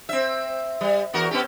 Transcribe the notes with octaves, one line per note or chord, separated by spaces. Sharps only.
C4 E5
G3
E2 F#4 A#4
B3 C#4 G4